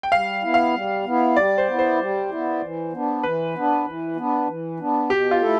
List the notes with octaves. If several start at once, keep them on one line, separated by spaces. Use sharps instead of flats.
G5
G3 F5
B3 E4
F5
G3
B3 E4
G3 D5
C5
B3 E4
C5
G3
B3 E4
E3
B3 D4
E3 B4
B3 D4
E3
B3 D4
E3
B3 D4
B2 G4
F4
A3 E4 A4